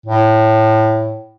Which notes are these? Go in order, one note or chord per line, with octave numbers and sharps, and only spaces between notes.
A2